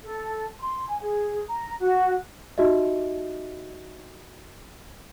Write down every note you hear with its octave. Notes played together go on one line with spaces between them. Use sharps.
A4
C6
G#5
G#4
A#5
F#4
D#4 F#4 G4 D#5 E5